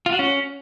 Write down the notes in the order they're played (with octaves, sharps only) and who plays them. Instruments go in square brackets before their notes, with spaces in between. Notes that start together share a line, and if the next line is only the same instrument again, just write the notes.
[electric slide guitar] F4
F#4
C#4